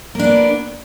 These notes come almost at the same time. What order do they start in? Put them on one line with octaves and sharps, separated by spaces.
A#3 D4 B3